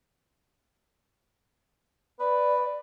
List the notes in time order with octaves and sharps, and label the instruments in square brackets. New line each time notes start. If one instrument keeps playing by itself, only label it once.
[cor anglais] B4 [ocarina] D5